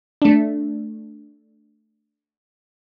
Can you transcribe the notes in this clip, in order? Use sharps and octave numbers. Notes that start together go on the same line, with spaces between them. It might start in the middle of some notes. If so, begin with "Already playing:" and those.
A3 D4